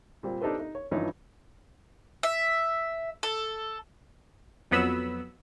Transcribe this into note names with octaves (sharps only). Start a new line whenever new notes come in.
A#2 G3 C4
D4 D#4 G4 A4 B4 C5
D#4
C#5
G2 E3 F3 C#4 D#4
E5
A4
F2 F#3 B3 B5 E6